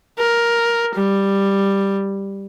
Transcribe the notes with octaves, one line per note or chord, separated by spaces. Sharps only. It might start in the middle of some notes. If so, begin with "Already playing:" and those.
A#4
G3